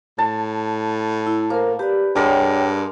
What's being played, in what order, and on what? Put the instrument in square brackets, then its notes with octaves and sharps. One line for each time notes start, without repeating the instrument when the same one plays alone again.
[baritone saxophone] A2 [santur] A5
[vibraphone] E4
[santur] A#3 [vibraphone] A#4 C5
[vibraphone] G4 D5 [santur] B4
[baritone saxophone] G2 [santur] G#3 A#4 D5 [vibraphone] C#5 F#5 G5